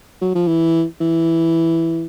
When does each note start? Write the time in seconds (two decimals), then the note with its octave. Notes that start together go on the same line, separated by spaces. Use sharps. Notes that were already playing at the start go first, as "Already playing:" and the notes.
0.22 F#3
0.35 F3
0.47 E3
1.01 E3